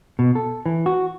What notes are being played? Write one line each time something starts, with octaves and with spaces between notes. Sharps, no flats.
B2
A4
E3
F#4